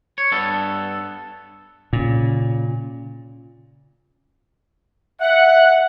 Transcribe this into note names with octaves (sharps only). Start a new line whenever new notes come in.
C#5
G2 B3 A4
A#2 C#3
E5 F#5